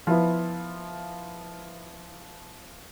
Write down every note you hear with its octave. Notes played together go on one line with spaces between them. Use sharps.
F3 B3 E4